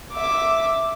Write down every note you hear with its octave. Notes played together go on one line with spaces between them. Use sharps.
E5 D6